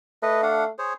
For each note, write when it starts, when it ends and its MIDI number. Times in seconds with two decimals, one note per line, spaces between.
0.23 0.69 57
0.23 0.41 71
0.23 0.41 75
0.43 0.64 62
0.43 0.64 77
0.43 0.64 78
0.79 0.93 68
0.79 0.93 72
0.79 0.93 73